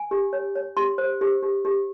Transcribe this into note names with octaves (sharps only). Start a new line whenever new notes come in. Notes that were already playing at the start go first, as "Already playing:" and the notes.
Already playing: G#5
G4
C#5
C#5
G4 C6
C5
G4
G4
G4